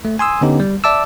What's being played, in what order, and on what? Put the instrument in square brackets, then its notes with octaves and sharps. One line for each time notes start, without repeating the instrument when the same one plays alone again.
[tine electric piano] A3
G#5 C6 D#6 E6
D3 B3 C#4 D#4 G4
G3
D5 E5 A5 D6 E6